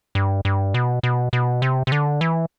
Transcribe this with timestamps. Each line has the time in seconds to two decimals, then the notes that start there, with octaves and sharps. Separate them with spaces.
0.15 G2
0.45 G2
0.74 B2
1.03 B2
1.33 B2
1.62 C3
1.87 C3
1.92 D3
2.21 E3